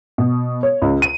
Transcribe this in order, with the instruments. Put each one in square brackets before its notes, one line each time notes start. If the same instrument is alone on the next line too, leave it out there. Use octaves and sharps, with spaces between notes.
[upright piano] B2
C#5
C#2
D#7